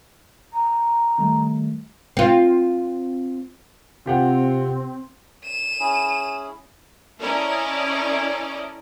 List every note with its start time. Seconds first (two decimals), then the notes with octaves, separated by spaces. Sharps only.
0.53 A#5
1.18 D#3 G3 A3
2.17 C4 F4
4.06 C3 C4 F4 G4 F#5
5.45 D#7 E7
5.80 C#4 E4 G#4
7.20 C#4 E4 A4 A#4 D5 D#5